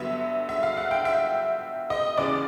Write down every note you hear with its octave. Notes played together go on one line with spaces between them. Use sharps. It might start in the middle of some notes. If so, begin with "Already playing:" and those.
Already playing: G2 D3 F#3 B3 E5
E5
F5
F#5
G5
E5
D#5
D#2 C#3 E3 D5